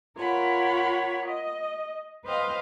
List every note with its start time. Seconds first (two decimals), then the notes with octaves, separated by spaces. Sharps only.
0.18 F4 A#4 C#5 F#5 B5
1.27 D#5
2.25 B4 C5 D#5 F5 G5